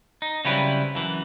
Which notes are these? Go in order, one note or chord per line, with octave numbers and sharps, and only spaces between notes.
D#4
C#3 F#3 G3 C4 E4 B4
F#2 E3